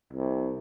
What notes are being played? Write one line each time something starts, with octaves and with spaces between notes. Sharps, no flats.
C2